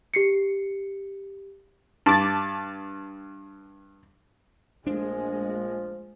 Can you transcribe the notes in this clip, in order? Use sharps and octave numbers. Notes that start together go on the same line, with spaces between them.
G4 C7 C#7
G2 A5 D6 A6
A#1 F3 G#3 A3 D4